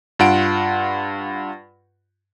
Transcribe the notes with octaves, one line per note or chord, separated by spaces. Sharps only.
G2 F4 F#5 D7